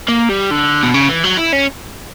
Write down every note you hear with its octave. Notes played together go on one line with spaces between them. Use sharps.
A#3
G3
D3
B2
C#3
E3
F#3
E4
C#4